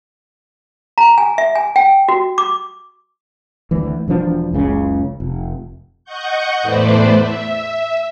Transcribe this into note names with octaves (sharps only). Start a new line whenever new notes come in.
A#5
G#5
E5
G#5
G5
F#4
D6
D2 E3
E1 E3 F3 D4
F#1 C#2 A#2 C#3
F1
D#5 F#5 C#6 G6
E2 A2 A3 B4 C5 D5
E5